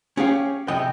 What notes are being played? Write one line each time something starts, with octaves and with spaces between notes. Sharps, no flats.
C#4 G4 G#4 C#5 F5 G5
C3 E3 D#5 G5